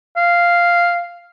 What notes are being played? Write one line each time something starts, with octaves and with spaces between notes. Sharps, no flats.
F5